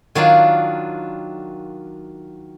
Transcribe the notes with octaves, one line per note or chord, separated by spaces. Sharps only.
D#3 F#3 D4 F4